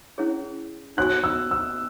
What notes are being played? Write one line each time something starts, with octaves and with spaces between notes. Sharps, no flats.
C#4 E4 G#4 C#5
D#4 F#4 C#5 G#5 C#6 F#6
E6
E6